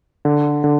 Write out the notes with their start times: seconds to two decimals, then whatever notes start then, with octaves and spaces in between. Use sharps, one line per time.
0.25 D3
0.64 D3